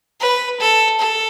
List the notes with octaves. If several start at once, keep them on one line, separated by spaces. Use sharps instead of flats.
B4
A4
A4